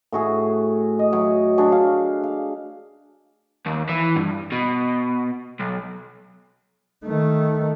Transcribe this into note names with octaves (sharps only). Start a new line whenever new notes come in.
A2 F#4 G#4
D#5
F#3
F#3 D4 G#4
F5
F5
D#2
E3
G2
B2
B1
D#3 A3